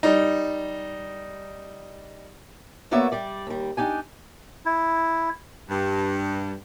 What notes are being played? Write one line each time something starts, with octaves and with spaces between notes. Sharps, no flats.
G3 D#4
A#3 B3 F#4 C#5 D5 E5
G3 D5
D#2 G3
D4 D#4 G4 G#5
E4
G2